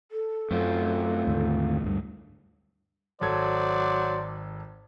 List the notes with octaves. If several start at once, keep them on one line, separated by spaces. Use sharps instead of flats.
A4
F#2 A3 C4 F4
D#2 G#2 D3
D2 G2 G3
G#1 F#3 A4 C5 D5 G#6